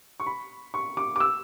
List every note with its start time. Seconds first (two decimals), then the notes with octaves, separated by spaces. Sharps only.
0.20 C#6
0.26 B5
0.74 C#6
0.97 D6
1.16 D6
1.20 E6